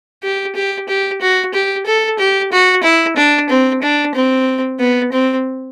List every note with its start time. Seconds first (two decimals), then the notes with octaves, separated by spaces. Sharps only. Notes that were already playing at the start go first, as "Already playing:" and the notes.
0.23 G4
0.55 G4
0.88 G4
1.21 F#4
1.53 G4
1.85 A4
2.19 G4
2.51 F#4
2.83 E4
3.16 D4
3.49 C4
3.82 D4
4.14 C4
4.79 B3
5.12 C4